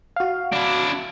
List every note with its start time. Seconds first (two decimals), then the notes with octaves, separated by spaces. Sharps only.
0.16 F#4 F5
0.53 D4 E4